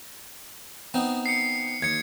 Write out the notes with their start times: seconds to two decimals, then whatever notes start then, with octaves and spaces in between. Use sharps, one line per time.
0.94 B3 C4 D#4
1.26 C7 C#7
1.82 D#2 G#6 C#7